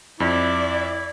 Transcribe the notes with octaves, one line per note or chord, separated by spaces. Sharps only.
F2 E4 D5